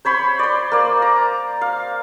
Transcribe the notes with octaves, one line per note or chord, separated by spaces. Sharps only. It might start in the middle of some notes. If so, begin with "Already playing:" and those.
C5 C#5 B5 C6
D5 C6
A#3 D5
A#5
F5